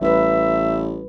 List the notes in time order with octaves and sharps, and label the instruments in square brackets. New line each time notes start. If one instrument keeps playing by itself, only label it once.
[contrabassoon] A1 [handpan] G3 B4 [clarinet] E5